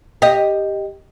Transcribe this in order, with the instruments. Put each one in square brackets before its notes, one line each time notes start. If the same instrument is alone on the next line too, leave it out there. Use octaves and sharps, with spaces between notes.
[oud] G4 D#5